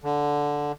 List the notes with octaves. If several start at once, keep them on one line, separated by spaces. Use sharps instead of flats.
D3